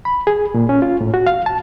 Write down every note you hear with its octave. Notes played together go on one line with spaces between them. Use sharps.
B5
G#4
A#2
C#4
F4
A2
F#4
F5
A5